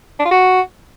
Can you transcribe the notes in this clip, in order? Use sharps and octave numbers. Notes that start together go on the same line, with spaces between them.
D4
F4
F#4